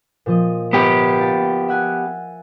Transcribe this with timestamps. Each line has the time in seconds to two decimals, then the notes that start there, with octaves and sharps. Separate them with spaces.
0.26 A#2 F3 D#5
0.73 B3 G4
1.19 F4 A5
1.68 E5 F#5 G#5